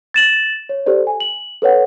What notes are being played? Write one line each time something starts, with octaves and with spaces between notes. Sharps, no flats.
A6 E7 F#7
C#5
G4 A4 C5 D5
G#5
F#7
A4 B4 C#5 F#5